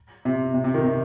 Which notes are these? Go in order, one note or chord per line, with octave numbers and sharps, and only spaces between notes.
C3
C3
C3
D#3
C3